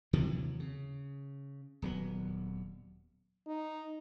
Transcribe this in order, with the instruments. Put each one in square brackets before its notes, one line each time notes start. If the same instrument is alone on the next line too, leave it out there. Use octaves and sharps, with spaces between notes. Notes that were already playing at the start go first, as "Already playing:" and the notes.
[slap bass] D#2 C3 E3 F#3
C#3
D#1 F#3 B3
[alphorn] D#4